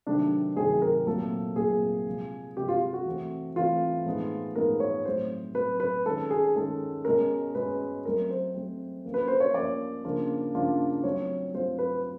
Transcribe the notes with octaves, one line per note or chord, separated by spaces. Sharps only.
C3 D#3 F#3 A3 C4 D4
C3 D#3 F#3 A3 C4 G#4
A#4
A#2 F#3 A3 C4 A4
A#2 F#3 A3 C4 G#4
C3 F3 G#3
C3 F3 G#3 G4
F4
F#4
E3 A3 C4
E3 A3 C4 F4
A2 F3 G#3 B3 D#4
A2 F3 G#3 B3 D#4 A#4
C#5
A2 F#3 A3 C4 C5
A2 F#3 A3 C4 B4
B4
D#3 G#3 C#4 A4
G#4
D#3 G#3 C#4 A4
B2 G#3 C#4 A#4
B2 G#3 C#4 B4
F#3 A3 C4 A#4
C5
F#3 A3 C4
F3 A#3 C#4 F4
B4
C5
C#5
F3 A#3 C#4 F4 D5
C#3 F3 A#3 D4 F4
C#3 F3 A#3 D4 F4
F#3 A3 C4 F4 C#5
F#3 A3 C4 F4 C5
B4